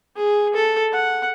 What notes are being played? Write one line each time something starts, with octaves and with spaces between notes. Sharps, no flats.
G#4
A4
F#5